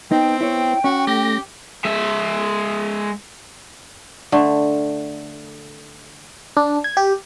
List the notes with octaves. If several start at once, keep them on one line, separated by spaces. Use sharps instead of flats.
B3 C4 D#4 G5
E4 C#5
C#4 F#4
A3 G4 A#6
G#3 E5
D3 A3
D4
G#6
G4